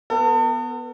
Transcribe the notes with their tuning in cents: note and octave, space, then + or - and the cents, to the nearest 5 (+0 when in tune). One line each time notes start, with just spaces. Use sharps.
B3 +0 A4 +40